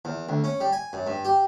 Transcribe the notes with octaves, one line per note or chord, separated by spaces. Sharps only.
E2
D2
C#4
G3
G#5
F#2
G2
G4